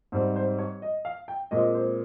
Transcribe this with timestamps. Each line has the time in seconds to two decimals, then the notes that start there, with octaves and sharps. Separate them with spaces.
0.12 G#2 G3 C4 C5
0.36 C5
0.58 C#5
0.82 D#5
1.05 F5
1.28 G5
1.51 A#2 G#3 C4 D#5
1.75 C5